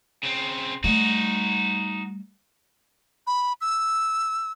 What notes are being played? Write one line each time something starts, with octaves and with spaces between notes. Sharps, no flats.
C#3 C4
G3 A3 D#4 F#4
B5
E6